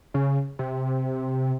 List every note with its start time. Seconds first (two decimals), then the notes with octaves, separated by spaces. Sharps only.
0.14 C#3
0.59 C3